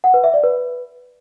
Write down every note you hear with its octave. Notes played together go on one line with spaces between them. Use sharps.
F#5
B4
E5
D5
B4